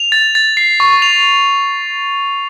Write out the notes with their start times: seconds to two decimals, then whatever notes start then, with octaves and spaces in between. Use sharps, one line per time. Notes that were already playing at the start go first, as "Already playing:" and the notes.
Already playing: F7
0.12 A6
0.35 A6
0.57 C7
0.80 C#6
1.02 F7